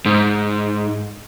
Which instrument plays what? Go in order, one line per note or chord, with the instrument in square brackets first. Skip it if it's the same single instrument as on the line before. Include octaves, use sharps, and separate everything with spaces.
[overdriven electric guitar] G#2